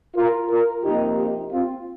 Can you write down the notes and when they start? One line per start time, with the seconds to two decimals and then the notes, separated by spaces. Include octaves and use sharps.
0.15 F4 A#4
0.49 F4 A#4
0.83 C3 F3 A#3 D#4 G4
1.17 D#4 G4
1.51 C4 F4